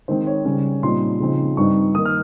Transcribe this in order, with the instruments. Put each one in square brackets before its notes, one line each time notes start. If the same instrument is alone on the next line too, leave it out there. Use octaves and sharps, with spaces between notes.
[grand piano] D#3 G#3 C4 D#4 C5
C#5
C#3 G3 C#4
A#2 G3 C4 D#4 C6
C#3 F3 C4 D#4
G2 G3 C4 D#4 C#6
D#3 A#3 D#4 D#6
F6